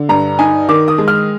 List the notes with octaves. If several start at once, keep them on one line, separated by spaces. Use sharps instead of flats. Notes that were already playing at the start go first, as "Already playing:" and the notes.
Already playing: D3
G2 A#5
D#4 G#5
D#3 D6
D#6
G#3
F6